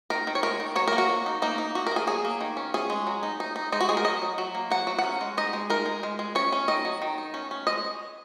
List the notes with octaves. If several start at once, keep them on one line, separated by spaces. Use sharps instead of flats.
D#3 A#4
D#3
C#5
G#3 A#4
D#3
F#3 C#5
A#4
A#3
F#4
F#3
D#4
A#3 D#4
D#4
A#3 F#4
A#4
A#3
G#4
F#3 G#4
A#3
D#3
C#4
C#4 G#4
G#3
F#3
D#4
D#4
D#4
G#3 D#4
F#4
G#3 G#4
A#4
F#3 D#5
F#3
F#3
A#3
F#3 F#5
F#3
F#5
C#4
G#3
D#4 D#5
G#3
D#4 A#4
G#3
G#3
G#3
C#4 C#5
C#4
D#3 D#5
F#3
D#3
D#4
C#4
C#4
G#3 D#5